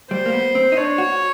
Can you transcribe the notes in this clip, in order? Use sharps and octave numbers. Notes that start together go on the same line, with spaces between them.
G3 C5
A#3
B3
C4
D#4
D4 C#5
F#4